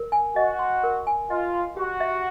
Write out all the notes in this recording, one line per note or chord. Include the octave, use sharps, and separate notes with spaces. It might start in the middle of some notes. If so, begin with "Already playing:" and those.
Already playing: A#4
G#5
F#4 D#5
C6
A#4
G#5
F4 D#5
C6
F#4 G4
E5